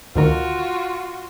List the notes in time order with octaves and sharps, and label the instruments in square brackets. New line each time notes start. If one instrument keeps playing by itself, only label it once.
[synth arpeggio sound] D2 D#3 A#4 [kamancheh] F4 F#4